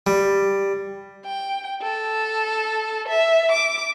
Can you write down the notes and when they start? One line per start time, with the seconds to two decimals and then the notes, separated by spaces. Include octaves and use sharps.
0.07 G3
1.26 G5
1.82 A4
3.08 E5
3.52 D6